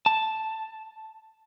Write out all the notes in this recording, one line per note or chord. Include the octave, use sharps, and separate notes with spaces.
A5